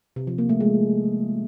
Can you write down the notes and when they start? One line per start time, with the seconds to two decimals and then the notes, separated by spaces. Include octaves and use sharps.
0.16 C3
0.27 F3
0.38 A#3
0.49 A3
0.60 G#3